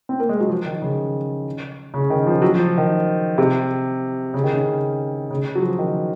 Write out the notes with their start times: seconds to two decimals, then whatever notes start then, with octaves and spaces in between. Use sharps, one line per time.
0.09 C4
0.20 A#3
0.29 G#3
0.41 F#3
0.49 F3
0.65 D#3
0.82 C#3
1.94 C#3
2.10 D#3
2.27 F3
2.42 F#3
2.55 F3
2.78 D#3
3.38 C3
4.34 C#3
4.44 D#3
4.53 C#3
5.31 C#3
5.55 F#3
5.62 F3
5.79 D#3